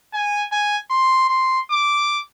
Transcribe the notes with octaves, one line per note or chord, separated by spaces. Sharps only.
G#5
G#5
C6
C6
D6